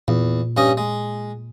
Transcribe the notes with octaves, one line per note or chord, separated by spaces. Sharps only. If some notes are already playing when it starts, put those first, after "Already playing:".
E2 A#2
G2 C#4 D#5
G#3